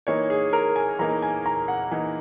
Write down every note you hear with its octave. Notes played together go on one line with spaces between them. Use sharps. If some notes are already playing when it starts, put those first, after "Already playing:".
E3 A#3 D#4 C#5
G#4
A#4
G#5
E3 A#3 D#4 A#5
G#5
A#5
F#5
E3 A#3 D#4